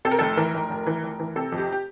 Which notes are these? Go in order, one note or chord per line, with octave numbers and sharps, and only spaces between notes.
C3 A4
A#4
F1 A4
E3 A#4
F1
F1
E3
F1
E3
C3 A4
F2
G4
G4